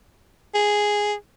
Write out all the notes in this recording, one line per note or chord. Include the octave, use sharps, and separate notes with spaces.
G#4